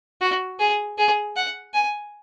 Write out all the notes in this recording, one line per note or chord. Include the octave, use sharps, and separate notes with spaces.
F#4
G#4
G#4
F#5
G#5